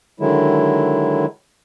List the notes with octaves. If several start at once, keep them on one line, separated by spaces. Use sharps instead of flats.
D3 D#3 F#3 G#3 E4